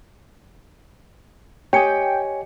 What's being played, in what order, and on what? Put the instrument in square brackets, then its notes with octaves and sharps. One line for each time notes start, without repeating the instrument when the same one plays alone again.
[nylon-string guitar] G4 D#5 [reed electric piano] C#5 G#5 [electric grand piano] G5 C#7